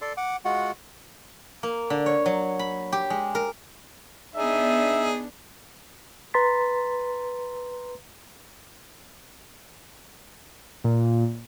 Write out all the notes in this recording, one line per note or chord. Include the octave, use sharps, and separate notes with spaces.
A4 D5 C6
F#5 D6
G#3 F4 F#4 F#5
A#3
D3
C#5
F#3
B5
G4
G#3
A#4
B3 D4 D#4 G#4 E5
B4 A#5 C6 A6 B6
A#2